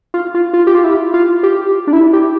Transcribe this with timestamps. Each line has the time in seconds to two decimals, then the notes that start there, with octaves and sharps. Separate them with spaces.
0.14 F4
0.34 F4
0.54 F4
0.67 G4
0.75 F4
0.84 E4
1.14 F4
1.43 G4
1.87 D4
1.93 E4
2.13 G4